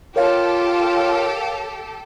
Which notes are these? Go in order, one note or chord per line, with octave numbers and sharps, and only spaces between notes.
F4 G4 A4 A#4 C#5 F5